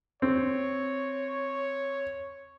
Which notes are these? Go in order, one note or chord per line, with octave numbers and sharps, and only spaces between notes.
C4 C#5